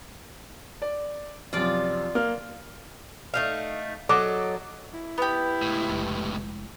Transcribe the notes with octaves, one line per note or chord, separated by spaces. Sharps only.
D5
F#2 C3 F3 F4 D5
A#3 F6
A3 D#4 F5
F#3 A4 D#5 D6
E4
B3 G4
C#2 A2
F1 G#3